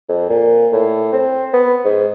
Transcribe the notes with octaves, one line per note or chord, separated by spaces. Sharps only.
F2
A#2
A2
C4
B3
G#2